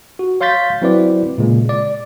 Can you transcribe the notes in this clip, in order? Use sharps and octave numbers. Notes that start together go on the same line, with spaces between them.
F#4
C#5 F5 C6 G6 A6 B6
F#3 C4 E4 B4 C5 D5
A#2 C#3 G#3
D5